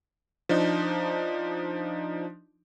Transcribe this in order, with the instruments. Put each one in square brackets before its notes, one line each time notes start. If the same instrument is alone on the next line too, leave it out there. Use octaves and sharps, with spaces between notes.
[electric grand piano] F3 D4 D#4